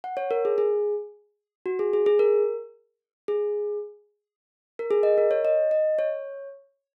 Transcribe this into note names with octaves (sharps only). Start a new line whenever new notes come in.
F#5
C#5
A#4
G#4
G#4
F#4
G#4
G#4
G#4
A#4
G#4
A#4
G#4
D#5
A#4
C#5
D#5
D#5
C#5